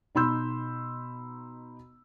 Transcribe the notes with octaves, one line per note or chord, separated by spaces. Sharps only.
B2 D#4 B5 C6 E6 G6